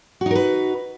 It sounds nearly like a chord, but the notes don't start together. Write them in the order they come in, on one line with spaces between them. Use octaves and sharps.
F#4 D#4 A#4 B4